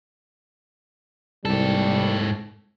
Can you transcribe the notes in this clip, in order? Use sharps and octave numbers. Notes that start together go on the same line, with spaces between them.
C2 G#2 G3 A4